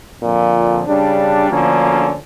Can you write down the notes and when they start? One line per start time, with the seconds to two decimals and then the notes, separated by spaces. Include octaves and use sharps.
0.23 F2 A#2 D3 F3
0.87 C#3 G3 D4
1.50 D2 D3 F3 A#3 C#4